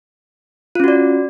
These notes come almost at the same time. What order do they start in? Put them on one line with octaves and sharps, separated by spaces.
F4 C#4 F#4 D5